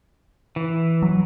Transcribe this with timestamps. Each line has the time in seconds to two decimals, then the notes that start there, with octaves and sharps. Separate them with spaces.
0.56 E3
1.02 F#3